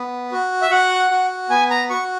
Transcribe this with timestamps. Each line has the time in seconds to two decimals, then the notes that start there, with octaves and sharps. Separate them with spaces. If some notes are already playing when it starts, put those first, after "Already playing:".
Already playing: B3
0.32 F#4
0.62 E5
0.71 F#4 F#5
1.11 F#4
1.50 B3 G#5
1.70 A#5
1.90 F#4 C#6